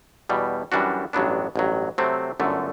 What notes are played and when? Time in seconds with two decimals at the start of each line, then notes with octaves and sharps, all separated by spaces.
0.29 E2 B2 G3
0.72 F#2 E3 G3 D4 F#4
1.13 A1 G2 F#3 B3 D4
1.56 A1 G2 F#3
1.98 C3 F#3 A3 C4
2.40 G1 F#2 D3 A3